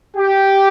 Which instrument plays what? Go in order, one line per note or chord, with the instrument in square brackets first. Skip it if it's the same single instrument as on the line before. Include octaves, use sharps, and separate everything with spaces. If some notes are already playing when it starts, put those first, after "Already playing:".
[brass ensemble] G4